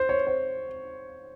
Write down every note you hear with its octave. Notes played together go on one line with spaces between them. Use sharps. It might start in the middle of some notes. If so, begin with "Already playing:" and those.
Already playing: C5
C#5
C5